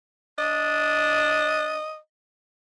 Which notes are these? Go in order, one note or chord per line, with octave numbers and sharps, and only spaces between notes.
D4 D#5